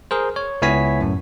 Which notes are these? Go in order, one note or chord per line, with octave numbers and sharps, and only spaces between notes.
G#4 A#4 C5
C#5
C#2 B3 E4 C#5 G#5 B6
F#2 A2